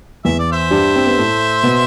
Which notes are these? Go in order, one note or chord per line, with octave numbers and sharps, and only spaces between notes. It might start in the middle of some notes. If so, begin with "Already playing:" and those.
E2 E3 E5
D5
C5 E5
G2 G3
C4
B3
A2 A3
B2 B3